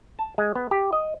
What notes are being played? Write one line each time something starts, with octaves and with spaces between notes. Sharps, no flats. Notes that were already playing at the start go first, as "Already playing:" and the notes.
A5
G#3
B3
G4
D#5